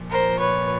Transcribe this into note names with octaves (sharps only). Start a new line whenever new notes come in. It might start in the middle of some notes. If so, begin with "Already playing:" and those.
Already playing: A#2 F3
A#4 C5
B4 C#5